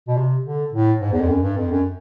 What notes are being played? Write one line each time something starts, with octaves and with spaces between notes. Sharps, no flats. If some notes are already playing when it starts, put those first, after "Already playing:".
B2
C3
D3
A2
G#2
E2
F2
F#2
G2
F2
F#2